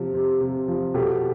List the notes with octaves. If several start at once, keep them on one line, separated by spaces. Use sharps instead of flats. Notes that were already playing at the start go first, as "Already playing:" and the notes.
Already playing: C3 F3
C3
C3
F3
B2 G4 A4